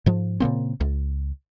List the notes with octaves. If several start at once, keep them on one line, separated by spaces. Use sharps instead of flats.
G#2 F3
A#2 C#3 A#3 C4
C#2